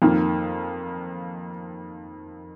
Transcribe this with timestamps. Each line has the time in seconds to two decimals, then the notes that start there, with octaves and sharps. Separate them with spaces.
0.02 F2 D#3 A#3